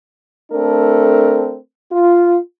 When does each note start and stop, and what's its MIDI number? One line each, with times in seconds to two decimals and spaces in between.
0.51 1.56 57
0.51 1.56 60
0.51 1.56 62
0.51 1.56 69
0.51 1.56 70
1.91 2.37 65